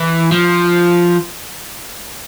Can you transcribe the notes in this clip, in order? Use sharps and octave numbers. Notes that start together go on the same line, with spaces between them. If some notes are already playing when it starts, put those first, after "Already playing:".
Already playing: E3
F3